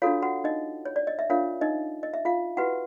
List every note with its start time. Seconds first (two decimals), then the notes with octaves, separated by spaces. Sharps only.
0.02 D4 F4 F#4 A4 C#5 F5
0.22 F#4 F#5
0.44 D#4 D#5
0.85 C#5
0.96 D5
1.07 D#5
1.19 E5
1.30 D4 F4 A#4 C#5 F5
1.61 D#4 D#5
2.03 D#5
2.14 E5
2.25 F4 F5
2.57 E4 F#4 G4 B4 F#5